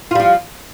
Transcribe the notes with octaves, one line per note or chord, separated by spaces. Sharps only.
F3 G3 F4